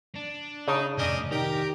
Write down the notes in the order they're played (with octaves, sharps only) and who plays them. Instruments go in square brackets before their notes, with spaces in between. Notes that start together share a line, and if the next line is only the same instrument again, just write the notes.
[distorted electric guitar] D4
[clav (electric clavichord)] C#3 [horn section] D#4 [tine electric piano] A5 D#6
[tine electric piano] F2 G6 [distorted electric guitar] A2 C3 [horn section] C#4 D4 D#5
[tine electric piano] D#3 D#4 [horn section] G4 [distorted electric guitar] A#4 A#5